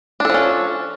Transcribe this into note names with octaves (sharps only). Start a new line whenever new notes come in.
F3 C#4 D4 A4